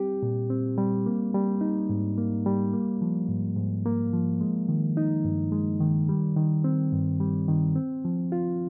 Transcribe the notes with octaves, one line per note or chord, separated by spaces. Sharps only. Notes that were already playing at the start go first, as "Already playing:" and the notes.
Already playing: G3 C4 G4
A#2
C4
G3
A#3
G3
D#4
G#2
A#3
G3
A#3
F3
G#2
G#2
A#3
F3
G#3
D#3
D#4
G2
G#3
D#3
G3
D#3
C4
G2
G3
D#3
C4
F3
F4